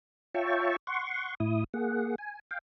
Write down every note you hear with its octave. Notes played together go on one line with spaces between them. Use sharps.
F4 C#5 E5 G5 A5 C#6
F#5 C6 C#6
A2 E4 D#6
A#3 G#4 F#5
G#5
F5 G5